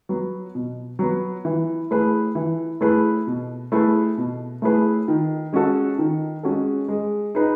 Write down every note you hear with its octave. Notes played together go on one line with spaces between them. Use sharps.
F#3 B3
B2
F#3 B3
E3
A3 E4 G#4 B4
E3
A3 E4 G#4 B4
B2
A3 E4 G#4 B4
B2
A3 E4 G#4 B4
D#3
G#3 C#4 F#4 A4
D#3
G#3 C#4 F#4 A4
G#3
D#4 G#4 B4